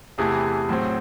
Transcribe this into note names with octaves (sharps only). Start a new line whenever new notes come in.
E2 C3 E3 A3 G#4
A2 F#3 C4